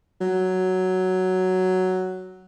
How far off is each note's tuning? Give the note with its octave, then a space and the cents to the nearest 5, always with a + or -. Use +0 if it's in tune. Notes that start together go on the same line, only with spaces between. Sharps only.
F#3 +5